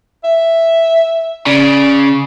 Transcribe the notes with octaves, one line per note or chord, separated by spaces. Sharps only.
E5
C#3 D5